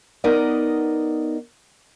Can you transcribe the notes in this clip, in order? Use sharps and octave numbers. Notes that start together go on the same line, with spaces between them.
B3 D#4 A#4 D5 D#5